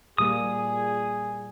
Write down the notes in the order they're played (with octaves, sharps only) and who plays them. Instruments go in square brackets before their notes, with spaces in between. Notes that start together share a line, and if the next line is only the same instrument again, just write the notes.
[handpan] A#2 G3 A#3 [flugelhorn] G#4 [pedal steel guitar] D#6